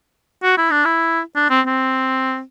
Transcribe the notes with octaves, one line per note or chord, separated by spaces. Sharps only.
F#4
E4
D4
E4
D4
C4
C4